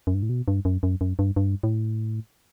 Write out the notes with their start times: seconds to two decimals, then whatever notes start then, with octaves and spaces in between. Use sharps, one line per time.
0.07 F#2
0.14 G2
0.23 A2
0.29 B2
0.48 G2
0.65 F#2
0.83 F#2
1.01 F#2
1.19 G2
1.36 G2
1.63 A2